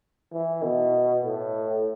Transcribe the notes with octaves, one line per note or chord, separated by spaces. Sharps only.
E3
B2
A2